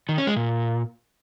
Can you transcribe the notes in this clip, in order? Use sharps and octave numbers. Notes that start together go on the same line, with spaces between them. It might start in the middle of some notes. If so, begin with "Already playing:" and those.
D#3
C#4
G#3
A#2